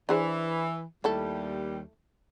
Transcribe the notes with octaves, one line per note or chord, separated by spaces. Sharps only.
E3 D4 G#4 C5
D#2 G3 A3 E4 A4